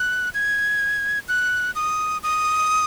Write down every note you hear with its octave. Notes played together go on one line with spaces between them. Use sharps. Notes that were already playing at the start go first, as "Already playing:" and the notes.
Already playing: F#6
G#6
F#6
D#6
D#6